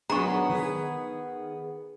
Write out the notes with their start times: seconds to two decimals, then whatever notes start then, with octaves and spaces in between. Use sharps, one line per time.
0.10 A2 D#3 F#3 B3 D4 G#4 A#5 C#6
0.50 D#3 G#4 B4